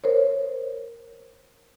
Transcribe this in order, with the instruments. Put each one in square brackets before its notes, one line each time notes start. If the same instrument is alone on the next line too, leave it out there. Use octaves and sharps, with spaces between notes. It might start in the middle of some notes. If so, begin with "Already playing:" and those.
[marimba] A#4 C5 C#5